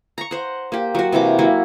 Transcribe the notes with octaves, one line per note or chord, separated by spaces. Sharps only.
A#5 C#6
C5 F#5
A#3 G4
F#3 F#4
C3 E3 A#3 D6
F#3 A#3 E4